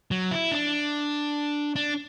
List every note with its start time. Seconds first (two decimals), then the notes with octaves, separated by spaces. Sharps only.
0.11 F#3
0.31 E4
0.52 D4
1.76 D4